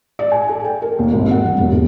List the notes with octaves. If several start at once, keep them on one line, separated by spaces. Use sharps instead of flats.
D5
G#5
A4
G5
A#4
D#2
G#1
F#5
G3
E1
D#1